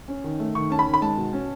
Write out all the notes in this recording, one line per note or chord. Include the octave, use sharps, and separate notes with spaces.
C#4
D#3
A3
D#3 C#6
C#4 A5
B5
D#3
B5
G#3 A5
B2
C#4